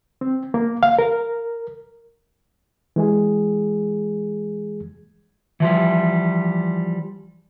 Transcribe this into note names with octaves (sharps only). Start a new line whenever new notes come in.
C4
A#3
F5
A#4
E3 G#3 G#4
E3 F3 G3